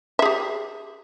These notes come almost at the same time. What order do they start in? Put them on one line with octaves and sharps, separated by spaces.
E5 G#4 G4